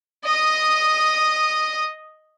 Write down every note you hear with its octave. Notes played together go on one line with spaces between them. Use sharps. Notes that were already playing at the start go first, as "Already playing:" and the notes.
D#5 D#6